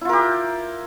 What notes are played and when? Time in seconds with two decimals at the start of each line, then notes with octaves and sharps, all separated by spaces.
0.01 E4
0.05 F4
0.09 A#4
0.13 G4